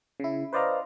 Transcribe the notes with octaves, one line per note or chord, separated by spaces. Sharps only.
C#3 E4
B4 C5 D5 D#5 F5 A#5